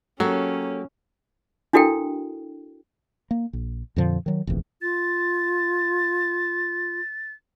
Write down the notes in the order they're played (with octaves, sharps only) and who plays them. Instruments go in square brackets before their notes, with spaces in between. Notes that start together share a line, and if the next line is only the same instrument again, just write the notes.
[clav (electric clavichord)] F#3 [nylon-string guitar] A#3 G4 A4 [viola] C#4
[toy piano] D4 E4 F#4 A4 A#4 G5
[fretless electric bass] A#3
A#1
F2 A#2 D3 F3
D#3 F#3
F1 A#1 E2
[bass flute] F4 [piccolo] A6